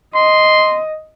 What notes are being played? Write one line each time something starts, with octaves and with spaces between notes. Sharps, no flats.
D#5 C6